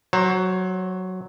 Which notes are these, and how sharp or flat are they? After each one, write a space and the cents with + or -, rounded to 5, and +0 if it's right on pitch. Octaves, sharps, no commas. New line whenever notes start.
F#3 +5 C5 +35